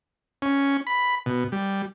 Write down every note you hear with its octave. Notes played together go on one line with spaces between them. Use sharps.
C#4
B5
B2
G3